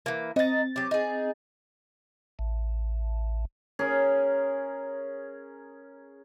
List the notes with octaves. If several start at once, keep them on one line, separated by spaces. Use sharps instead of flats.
E3 A#3
C4 D#5 A#5 A6
F#3 G4
D#4 G#4
A1
C#4 G#4 A#4